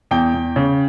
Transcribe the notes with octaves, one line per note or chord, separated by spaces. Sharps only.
E2 G5
E2
C#3